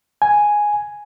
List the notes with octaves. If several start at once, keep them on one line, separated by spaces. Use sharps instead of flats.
G#5